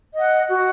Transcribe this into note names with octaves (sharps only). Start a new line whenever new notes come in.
D#5 F#5
F#4